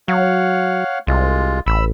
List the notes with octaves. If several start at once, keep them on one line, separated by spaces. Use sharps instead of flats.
F#3 C#5 F5 F#5
C2 G#3 F4
A1 B5 E6